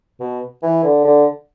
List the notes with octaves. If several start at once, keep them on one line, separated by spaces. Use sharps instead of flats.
B2
E3
D3
D3